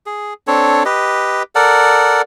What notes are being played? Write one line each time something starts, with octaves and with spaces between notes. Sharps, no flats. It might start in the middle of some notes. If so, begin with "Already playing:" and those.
G#4
C4 D4 A4 C#5
G4 B4 D#5
A4 A#4 D5 F#5